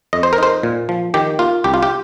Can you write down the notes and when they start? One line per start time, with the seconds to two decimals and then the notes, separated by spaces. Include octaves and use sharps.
0.13 F2 D#5
0.23 C5
0.33 A#4
0.38 D#4 C5
0.63 A#2
0.89 F3
1.14 D#3 G4
1.39 A#3 F4
1.64 C2 G4
1.74 F4
1.83 G4